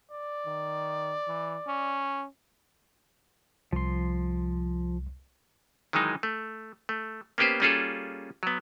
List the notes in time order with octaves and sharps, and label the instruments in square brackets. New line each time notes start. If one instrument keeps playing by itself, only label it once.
[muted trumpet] D5
[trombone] D#3
E3
C#4
[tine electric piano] C2 [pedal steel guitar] F3 C6
[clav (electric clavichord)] D#3 E3 F#3 G#3 D#4
A3
A3
A#3 B3 C#4 G4 B4 C5
G3 A#3 C#4 F4 G#4 A4
F#3 B3